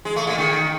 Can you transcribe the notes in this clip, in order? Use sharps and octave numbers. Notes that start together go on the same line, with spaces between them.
G#3
A3
A#2
D#3